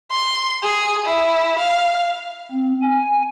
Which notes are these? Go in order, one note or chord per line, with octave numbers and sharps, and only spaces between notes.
C6
G#4
E4
F5
C4
G#5